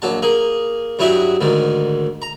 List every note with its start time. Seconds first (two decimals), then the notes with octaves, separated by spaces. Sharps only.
0.02 A#1 F#3 A5
0.22 A#3 G#4
0.99 G2 F#3 E4 G#4 E5 G5
1.41 D2 G#2 D#3
2.22 A#5